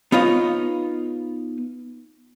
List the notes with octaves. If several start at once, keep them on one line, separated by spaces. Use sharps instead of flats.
B3 D#4 F4 C#5 D#5